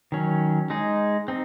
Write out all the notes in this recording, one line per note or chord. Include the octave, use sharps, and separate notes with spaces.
D#3 F#3 C#4
G#3 D#4 G#4
C4 D#4